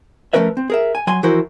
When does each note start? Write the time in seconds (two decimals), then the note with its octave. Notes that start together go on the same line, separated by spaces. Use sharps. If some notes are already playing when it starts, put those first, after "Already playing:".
0.33 F3 A3 C#4 A#4 B4 E5
0.57 C4
0.70 G#4 A#4 E5
0.95 G#5
1.07 F#3 G#5 C6
1.23 E3 F3 E4 F#4 A#4 C5